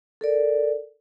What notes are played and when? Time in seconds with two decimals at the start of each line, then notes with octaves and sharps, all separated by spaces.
0.21 A4 A#4 D5